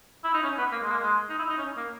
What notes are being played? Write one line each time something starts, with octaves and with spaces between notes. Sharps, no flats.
E4
D#4
C#4
B3
A#3
G#3
A#3
G#3
D#4
E4
D#4
C#4
A#3